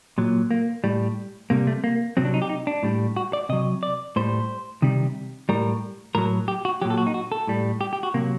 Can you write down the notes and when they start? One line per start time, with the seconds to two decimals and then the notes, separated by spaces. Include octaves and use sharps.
0.18 A#2 F#3
0.51 A#3
0.84 A2 G3
1.50 C3 G3 A#3
1.67 A3
1.84 A#3
2.17 C3 F#3 C4
2.25 D4
2.34 D#4
2.42 G4
2.49 D#4
2.67 D4
2.83 A2 G3
3.16 F#4
3.33 D5
3.49 C3 F#3 D#5
3.83 D5
4.16 A2 G3 C5
4.82 C3 D#3 G3
5.49 A2 G3 A#4
6.15 A2 F#3 A#4
6.48 G4
6.65 F#4
6.82 A#2 F#3 G4
6.90 A4
6.98 F#4
7.07 D#4
7.14 F#4
7.32 A4
7.47 A2 G3
7.81 G4
7.93 G4
8.03 F#4
8.14 C3 A#3
8.17 F#3